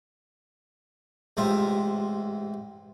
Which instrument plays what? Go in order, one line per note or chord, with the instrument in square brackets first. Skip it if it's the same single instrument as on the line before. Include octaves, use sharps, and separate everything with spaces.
[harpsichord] A1 G#2 C3 F4 E5